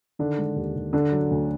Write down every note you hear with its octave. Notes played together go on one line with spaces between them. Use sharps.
D3 D#3 D4
G#3
D#2
D#2
D3 D4
F#3
D2